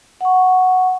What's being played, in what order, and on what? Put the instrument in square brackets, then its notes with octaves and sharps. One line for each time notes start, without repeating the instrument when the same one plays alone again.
[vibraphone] F#5 C#6